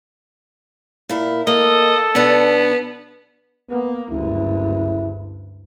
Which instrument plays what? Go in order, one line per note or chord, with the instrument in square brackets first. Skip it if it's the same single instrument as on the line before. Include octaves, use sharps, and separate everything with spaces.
[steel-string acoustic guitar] A#2 E4 A#4
[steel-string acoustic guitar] A#3 [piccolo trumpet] A4 [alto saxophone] D#5
[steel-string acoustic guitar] B2 D4 [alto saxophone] B3
[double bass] A#3 [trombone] B3
[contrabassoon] F#1 [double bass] D2 G2 [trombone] E4